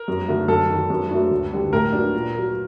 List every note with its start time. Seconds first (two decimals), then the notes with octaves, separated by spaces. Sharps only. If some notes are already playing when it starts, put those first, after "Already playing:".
Already playing: A#4
0.08 F#2
0.28 D3 F#3 A3
0.48 F#2 A4
0.69 D#3 F#3
0.90 F#2
1.11 F#3 A3 D4 F#4
1.32 D2
1.52 D3 G3 D4
1.73 A2 A#4
1.92 F#3 A#3 D4
2.14 A#2
2.35 F#3 A#3